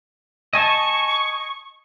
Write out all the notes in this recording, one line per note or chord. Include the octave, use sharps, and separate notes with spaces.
D#5 G#5 A5 C#6